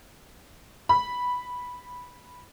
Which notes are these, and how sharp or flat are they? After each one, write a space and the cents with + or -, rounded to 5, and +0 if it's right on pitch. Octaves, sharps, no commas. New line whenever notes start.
B5 -5